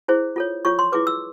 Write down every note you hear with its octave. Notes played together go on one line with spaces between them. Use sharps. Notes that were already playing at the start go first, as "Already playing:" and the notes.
E4 G#4 C5
F4 A4 C#5
F4 A4 C#5 C#6
C6
E4 G#4 B4 D6
E6